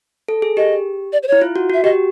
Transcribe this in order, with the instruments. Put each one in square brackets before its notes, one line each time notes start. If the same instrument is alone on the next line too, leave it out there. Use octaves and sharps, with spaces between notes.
[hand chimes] A4
G#4
[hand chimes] G4 [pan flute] D#5
[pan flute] D5
C5
[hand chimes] E4 [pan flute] C#5
[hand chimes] F4
F#4
[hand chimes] F#4 [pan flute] E5
[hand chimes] G4 [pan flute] D#5